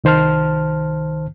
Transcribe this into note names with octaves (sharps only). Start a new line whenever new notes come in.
C2 D#3 C5 A5 F6